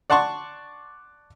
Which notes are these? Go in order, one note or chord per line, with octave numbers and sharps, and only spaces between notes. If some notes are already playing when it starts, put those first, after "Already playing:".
D5 F#5 A5 C6 C#6